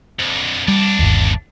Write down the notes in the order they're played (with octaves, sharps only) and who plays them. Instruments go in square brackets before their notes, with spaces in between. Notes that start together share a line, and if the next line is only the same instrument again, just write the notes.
[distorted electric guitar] F2 D3
[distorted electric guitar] C2 D4 [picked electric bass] G3
[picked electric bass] G1 D#2